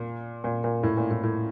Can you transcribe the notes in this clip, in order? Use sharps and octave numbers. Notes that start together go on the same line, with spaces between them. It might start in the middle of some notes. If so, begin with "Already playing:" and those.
Already playing: A#2
A#2
A#2
A2
A#2
A2
A2